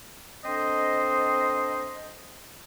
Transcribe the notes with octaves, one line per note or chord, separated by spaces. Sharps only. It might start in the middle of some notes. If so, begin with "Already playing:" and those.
C4 D4 A4 C5 D#5